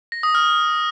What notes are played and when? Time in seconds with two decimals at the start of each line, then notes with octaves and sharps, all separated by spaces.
0.12 A#6
0.23 D#6
0.35 F6